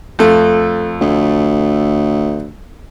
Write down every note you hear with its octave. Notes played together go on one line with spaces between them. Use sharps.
F2 A3
D2